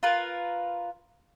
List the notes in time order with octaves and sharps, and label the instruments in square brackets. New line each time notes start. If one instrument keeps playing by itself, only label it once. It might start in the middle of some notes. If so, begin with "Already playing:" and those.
[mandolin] F4 A#4 B4